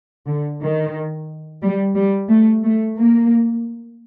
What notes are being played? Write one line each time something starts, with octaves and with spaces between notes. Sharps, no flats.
D3
D#3
G3
G3
A3
A3
A#3